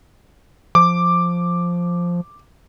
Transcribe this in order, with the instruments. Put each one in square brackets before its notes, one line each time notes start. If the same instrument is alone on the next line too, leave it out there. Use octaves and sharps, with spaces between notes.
[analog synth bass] F3 [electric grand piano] D6